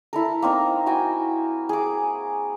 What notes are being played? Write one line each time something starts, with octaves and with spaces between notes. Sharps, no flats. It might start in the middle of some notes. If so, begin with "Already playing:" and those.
E4 A4 A#4
A#3 C4 D#4
E4 F#4 G5 G#5
G#4 D6